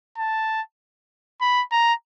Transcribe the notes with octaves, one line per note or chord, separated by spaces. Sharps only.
A5
B5
A#5